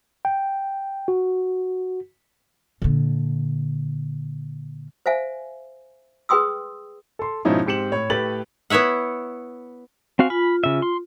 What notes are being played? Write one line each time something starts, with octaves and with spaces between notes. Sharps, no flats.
G5
F#4
A#2 D3
C5 E5 F5 G#5
G#4 B4 G5 C6 D#6 E6
A4 C6
G#2 B2 F3 C#4 D#4 E4
G#2 C4 G4 C#7 E7 F#7
A2 C#5
A2 A3 G4 B4 A6 F#7
B3 E4 C#5 E5 F#5
C4 F#4 F5 G#5
F4 B5
C#3 E5
C6